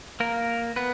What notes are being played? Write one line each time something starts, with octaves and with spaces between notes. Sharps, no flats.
A#3 A#4
B3 B4